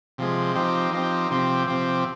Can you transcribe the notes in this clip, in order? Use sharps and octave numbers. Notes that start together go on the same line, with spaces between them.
C3 F3 G#3
F3 C4 D#4 G4
F3 C4 D#4 G4
C3 F3 C4 G4
C3 F3 C4 G4